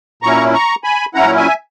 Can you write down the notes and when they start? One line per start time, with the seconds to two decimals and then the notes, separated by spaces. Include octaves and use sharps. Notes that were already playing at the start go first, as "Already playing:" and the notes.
0.22 A#2 F#3 C#4 E4 A#5 C#6
0.54 A#5 C#6
0.84 G#5 B5
1.14 A#2 F#3 C#4 E4 F#5 A#5
1.38 E5 G#5